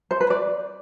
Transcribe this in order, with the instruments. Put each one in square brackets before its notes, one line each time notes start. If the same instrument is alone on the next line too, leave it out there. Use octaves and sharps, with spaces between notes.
[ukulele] C5
B4
D5